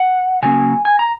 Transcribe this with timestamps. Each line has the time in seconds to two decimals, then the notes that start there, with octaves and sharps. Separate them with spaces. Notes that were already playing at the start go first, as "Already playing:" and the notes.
Already playing: F#5
0.43 C#3 F#3 A#3 C#4 G#5
0.85 G#5
0.99 A#5